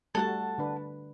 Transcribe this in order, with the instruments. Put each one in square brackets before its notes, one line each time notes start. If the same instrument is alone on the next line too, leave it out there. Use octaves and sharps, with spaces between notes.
[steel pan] G3 A3 F#4 [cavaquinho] A4 F#5 A5
[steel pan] D3 D4 B4